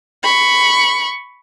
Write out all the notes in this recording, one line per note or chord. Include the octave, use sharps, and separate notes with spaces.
B5 C#6